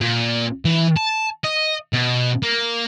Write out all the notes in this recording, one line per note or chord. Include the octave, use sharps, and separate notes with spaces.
A#2
E3
A5
D#5
B2
A#3